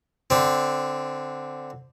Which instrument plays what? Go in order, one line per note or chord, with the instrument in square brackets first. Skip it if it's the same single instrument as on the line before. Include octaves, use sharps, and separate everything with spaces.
[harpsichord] D3 C4